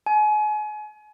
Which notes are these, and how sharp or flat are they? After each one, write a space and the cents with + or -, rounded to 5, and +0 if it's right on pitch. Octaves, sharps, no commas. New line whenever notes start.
G#5 +35